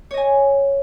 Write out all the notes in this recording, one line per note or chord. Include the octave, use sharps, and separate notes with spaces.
C#5 D#5 G#5